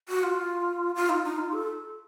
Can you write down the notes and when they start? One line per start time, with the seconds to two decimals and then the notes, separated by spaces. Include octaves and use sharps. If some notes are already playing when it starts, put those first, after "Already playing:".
0.09 F#4
0.23 F4
0.95 F4
1.09 D#4
1.24 D#4
1.38 F4
1.53 A4